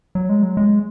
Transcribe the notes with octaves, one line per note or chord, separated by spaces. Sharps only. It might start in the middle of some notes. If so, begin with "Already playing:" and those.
F#3
G#3
F#3
G#3